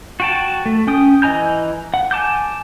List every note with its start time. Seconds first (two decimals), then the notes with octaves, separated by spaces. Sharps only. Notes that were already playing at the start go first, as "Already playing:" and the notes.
0.20 F#4 G5 A5
0.66 A3
0.87 C#4 G5 D#6
1.22 E3 D#5 G#5 A#5 G6
1.94 F#5
2.11 G#5 A5 D6 G6